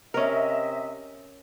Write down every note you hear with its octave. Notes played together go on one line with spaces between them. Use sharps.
C3 C#4 A#4 D#5 E5